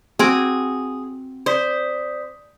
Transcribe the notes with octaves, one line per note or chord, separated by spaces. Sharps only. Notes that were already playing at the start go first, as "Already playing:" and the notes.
C4 F#4 G#4 D6
C5 D5 D#6 B6